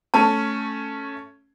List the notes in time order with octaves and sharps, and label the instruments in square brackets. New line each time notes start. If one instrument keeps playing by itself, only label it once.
[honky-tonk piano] A3 C#4 [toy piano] A5